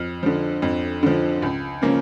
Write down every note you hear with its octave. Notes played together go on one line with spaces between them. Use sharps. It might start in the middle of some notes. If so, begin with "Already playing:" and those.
Already playing: F2 F6
D3 F3
F2
D3 F3
C#2
C#3 F3 A#3 C#4